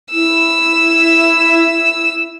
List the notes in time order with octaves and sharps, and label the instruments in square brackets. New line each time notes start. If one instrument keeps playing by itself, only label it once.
[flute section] E4 [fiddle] E6